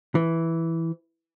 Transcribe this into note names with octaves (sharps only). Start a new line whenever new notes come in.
E3